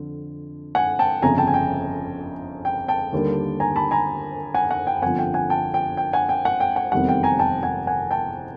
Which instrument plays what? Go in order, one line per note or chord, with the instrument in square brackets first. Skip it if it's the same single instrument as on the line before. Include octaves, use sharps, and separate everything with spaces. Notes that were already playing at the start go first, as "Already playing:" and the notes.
Already playing: [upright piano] F2 D3
F#5 G#5
G5 A5
G1 F2 C#3 G#5 A#5
G5 A5
G#5
G5
G5
G5 A5
D#2 D3 G3 A#3
G#5 A#5
A5 B5
G#5 A#5
F#5 G#5
F#5
G5
G1 F2 D3 F3 F#5 G#5
G5
F#5 G#5
G5 A5
G5
G5
F#5 G#5
G5
F#5
G5
F#5
F1 E2 C3 D#3 G3 F#5
G5
G#5 A#5
G5 A5
F#5 G#5
F#5 G#5
G5 A5